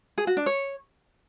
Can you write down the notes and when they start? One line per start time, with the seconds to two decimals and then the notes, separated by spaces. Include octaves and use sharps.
0.18 G#4
0.27 F#4
0.37 D4
0.46 C#5